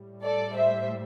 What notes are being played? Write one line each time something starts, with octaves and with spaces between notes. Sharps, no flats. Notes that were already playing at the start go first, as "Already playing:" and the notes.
Already playing: A2 G3
A4 D5
C5 E5